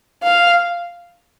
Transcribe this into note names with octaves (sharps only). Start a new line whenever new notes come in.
F5